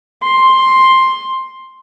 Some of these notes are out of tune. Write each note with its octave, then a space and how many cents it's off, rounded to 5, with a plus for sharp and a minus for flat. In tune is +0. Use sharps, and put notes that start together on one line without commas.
C6 +10